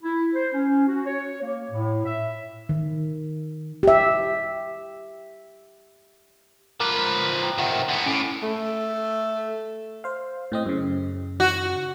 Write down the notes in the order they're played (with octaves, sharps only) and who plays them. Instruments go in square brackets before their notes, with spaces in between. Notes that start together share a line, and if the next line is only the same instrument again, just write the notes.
[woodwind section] E4
C5
C#4
F#4
C#5
A#3
A2
E5
[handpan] D#3
G4 E5
[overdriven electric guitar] F3 B4 [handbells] A#4 A#5 D6
[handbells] G5 A#5
[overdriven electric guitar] C3 D#3 [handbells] F#5 G5
[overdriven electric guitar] D3 B3
[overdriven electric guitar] A2 [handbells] C#4 D7
[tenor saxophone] A3
[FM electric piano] C5 F5
A2 C4 D#5
F#2 C#3
[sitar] F#4